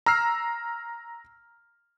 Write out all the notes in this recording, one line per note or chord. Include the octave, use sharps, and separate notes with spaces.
A#5 E6 F6 C7